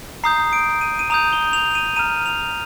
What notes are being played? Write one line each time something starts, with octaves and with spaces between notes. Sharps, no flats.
A#5 D#6 G6 C7
D7
D#7
D#7
A#5 D#6 G6 F7
G7
F7
D#7
A#5 F6 D#7
F7